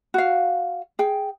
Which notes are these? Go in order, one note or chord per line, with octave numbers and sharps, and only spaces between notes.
F#4 F5
G#4 G5